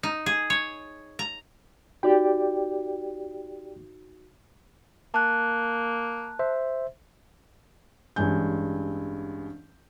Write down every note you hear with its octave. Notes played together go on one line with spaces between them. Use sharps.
D#4
G#4
C#5
A#5
D#4 F#4 G4 D5 G5
A#3 A5 F#6
C5 E5
A1 G2 G#3 G#5 G6